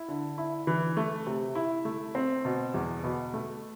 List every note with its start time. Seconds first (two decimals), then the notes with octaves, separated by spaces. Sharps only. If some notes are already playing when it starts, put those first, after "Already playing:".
Already playing: E4
0.08 D3
0.38 E4
0.67 E3
0.97 A3
1.27 C3
1.55 E4
1.85 A3
2.15 C4
2.45 B2
2.74 E2
3.04 B2
3.34 A3